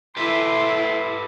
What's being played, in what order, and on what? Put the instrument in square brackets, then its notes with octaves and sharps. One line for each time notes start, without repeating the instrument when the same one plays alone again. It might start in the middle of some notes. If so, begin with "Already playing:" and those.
[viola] E4 A4 [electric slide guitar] G4 B4 E5 [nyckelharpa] C6